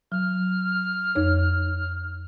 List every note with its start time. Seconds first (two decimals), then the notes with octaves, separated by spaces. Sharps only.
0.12 F#3 F6
1.15 F2 D#4 C#5